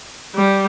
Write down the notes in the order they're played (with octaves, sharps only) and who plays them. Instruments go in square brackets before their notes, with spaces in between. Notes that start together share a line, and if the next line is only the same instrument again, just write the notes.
[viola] G3